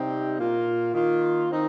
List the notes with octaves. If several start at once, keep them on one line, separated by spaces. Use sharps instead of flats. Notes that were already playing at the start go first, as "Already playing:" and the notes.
Already playing: C3 G3 C4 D#4 G4
A#2 A#3 F4
D#3 A#3 F4
D#3 C4 D#4